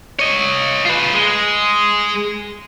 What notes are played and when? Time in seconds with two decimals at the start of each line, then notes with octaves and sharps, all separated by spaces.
0.19 C#5 D#5
0.85 F4 B4
1.14 G#3